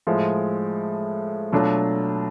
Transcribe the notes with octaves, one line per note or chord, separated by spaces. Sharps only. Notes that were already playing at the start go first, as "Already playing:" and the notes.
A2 F3 G#3
B2 F#3 A3 D4 F4